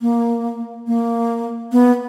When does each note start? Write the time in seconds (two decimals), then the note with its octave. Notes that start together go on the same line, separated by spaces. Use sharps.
0.01 A#3
0.87 A#3
1.72 B3